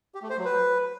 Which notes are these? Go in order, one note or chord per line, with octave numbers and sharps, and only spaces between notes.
G4
A3
C5
F#3
B4